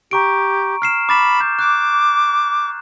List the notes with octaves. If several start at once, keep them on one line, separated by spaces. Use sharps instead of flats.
G4 A#5 C#6 D7
F6 C7 E7
B5 D6 A6 E7
G6
D6 F#6